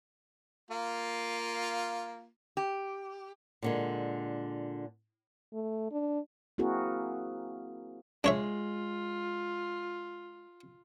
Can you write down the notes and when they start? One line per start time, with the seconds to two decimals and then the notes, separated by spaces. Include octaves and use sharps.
0.71 A#3 F4
2.57 G4
3.63 A#2 D3 G#3
5.53 A3
5.91 D4
6.58 A#3 C4 E4 F#4 G#4 A#4
8.24 G#3 D4 F4 C#5 E5